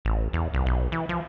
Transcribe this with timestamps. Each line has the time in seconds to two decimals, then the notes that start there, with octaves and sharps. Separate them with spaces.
0.05 A1
0.33 E2
0.54 C2
0.66 B1
0.92 E3
1.09 F3